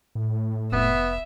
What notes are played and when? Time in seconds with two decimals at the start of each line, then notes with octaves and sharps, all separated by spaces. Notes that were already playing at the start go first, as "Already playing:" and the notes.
0.15 A2
0.72 F1 B3 E5